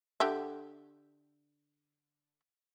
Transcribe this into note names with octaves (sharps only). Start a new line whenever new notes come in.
D3 G4 E5